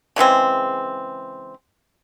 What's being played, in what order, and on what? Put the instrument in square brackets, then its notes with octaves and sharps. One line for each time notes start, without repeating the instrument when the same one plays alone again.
[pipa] C#3 E3 G#3 C4